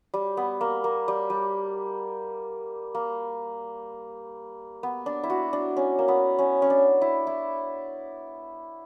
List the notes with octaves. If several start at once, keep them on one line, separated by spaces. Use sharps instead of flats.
G3
B3
A#3
A#3
G3
G3
A#3
B3
D4
E4
F#4
D4
C#4
A#3
B3
C#4
C#4
D4
E4
E4